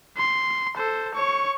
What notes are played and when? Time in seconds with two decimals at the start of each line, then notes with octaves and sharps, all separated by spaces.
0.17 C6
0.77 A4 C5
1.14 C#5 C#6